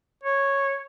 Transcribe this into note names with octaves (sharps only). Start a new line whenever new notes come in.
C#5